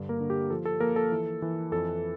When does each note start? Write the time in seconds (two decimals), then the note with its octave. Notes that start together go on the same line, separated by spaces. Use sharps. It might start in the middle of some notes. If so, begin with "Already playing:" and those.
Already playing: G2 D3
0.09 A#3 A#4
0.20 D3
0.30 G4
0.50 F3 A4
0.65 A4
0.80 F3 A#3 A#4
0.96 A4
1.12 E3
1.42 E3
1.71 F2 A4